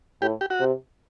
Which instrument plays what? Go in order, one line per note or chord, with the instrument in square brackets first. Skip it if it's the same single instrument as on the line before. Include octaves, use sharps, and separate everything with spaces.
[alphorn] A2 [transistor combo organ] G4
[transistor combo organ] G4
F#4
[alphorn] C3